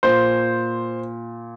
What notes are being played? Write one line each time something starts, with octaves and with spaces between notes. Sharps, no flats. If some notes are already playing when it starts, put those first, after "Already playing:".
A#2 C5